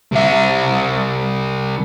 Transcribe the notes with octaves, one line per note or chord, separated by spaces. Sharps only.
C2 E5